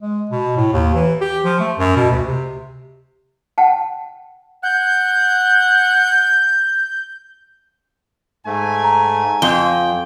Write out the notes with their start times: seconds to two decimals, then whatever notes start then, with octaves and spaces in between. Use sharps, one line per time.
0.02 G#3
0.31 B2
0.57 A2
0.73 D#2
0.94 E3
1.21 G4
1.44 F3
1.60 A3
1.78 F#2
1.96 B2
2.11 D2
2.27 C3
3.58 F#5 G5 A5
4.64 F#5 G6
8.46 G#2 A3 G#5
8.84 A#5
9.42 F2 G5 G7